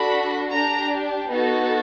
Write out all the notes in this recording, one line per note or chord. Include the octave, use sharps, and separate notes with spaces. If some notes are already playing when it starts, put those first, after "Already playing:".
Already playing: D4 F#4 A4 B5
D4 G4 A#5
B3 D#4 F#4 A4